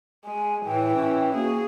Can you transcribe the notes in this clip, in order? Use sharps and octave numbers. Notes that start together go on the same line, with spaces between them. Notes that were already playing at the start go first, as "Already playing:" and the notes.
G#3 G#5
A2 E3 G5
C#4
A#3 F#4 G#4